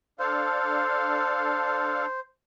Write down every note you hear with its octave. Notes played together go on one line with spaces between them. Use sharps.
D4 A4 C5 F5